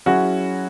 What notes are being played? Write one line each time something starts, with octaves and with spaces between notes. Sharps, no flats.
F#3 C#4 E4 F#4 G#4